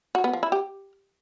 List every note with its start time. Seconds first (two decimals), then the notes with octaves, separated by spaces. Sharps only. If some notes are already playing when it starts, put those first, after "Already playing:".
0.15 F#4
0.24 B3
0.33 F3
0.43 E4
0.52 G4